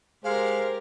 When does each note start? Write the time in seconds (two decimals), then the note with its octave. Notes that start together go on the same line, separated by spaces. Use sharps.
0.24 G#3 G4 A#4 C5 F5